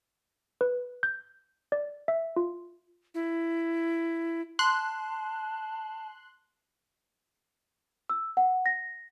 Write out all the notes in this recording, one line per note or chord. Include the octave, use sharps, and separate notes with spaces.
B4
G6
D5
E5
F4
E4
A5 C6 F#6
E6
F#5
A#6